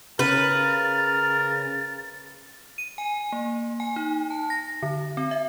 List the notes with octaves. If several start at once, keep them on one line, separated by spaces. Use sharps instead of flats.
C#3 A#4 B4 A6
D#7
G#5
A#3
G#5
D#4
A5
A#6
D3
C4
E5